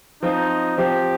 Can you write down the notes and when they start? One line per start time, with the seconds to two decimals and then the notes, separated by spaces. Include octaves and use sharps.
0.23 F3 C4 D#4 F4
0.77 F3 C4 F4 G4